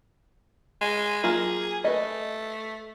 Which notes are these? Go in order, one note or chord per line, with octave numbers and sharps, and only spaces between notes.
G#3
F#3 A#3 F4 G#4
A3 B4 D#5